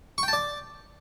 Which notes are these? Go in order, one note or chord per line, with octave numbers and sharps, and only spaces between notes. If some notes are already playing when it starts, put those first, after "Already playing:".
C#6
G5
A5
D5